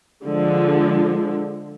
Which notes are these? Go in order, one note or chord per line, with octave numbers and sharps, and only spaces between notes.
D3 F3 G#3